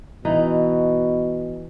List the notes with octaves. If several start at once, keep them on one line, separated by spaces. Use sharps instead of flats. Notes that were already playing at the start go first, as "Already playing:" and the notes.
B2 E3 D#4